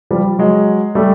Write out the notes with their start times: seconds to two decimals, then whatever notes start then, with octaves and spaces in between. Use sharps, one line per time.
0.11 F3 G3
0.39 F#3 G#3
0.95 G3 A3